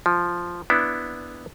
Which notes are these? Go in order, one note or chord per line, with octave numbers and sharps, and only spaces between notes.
F3
B3 D4 E4